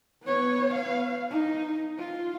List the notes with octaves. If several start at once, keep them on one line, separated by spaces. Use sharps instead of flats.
B3 C#5
B3 F5
D#4
F4